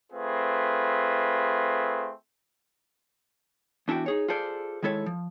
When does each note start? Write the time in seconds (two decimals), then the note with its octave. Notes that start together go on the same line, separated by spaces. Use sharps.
0.11 A3 C4 F4 G#4 B4
3.88 E2 D4 E4 F#4 G5
4.06 D#4 G#4 C#5
4.28 F4 G#4 A4 C5 D5
4.83 D#3 G#3 E4 A4 C#5
5.06 F3